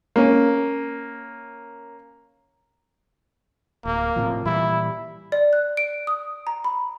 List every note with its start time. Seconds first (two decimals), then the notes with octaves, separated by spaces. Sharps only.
0.16 A#3 C#4
3.85 D1 A#3
4.16 A2 C3 F3
4.46 A#2 E3 G3 E4
5.32 D5
5.53 F#6
5.77 D7
6.07 D#6
6.47 A#5
6.64 B5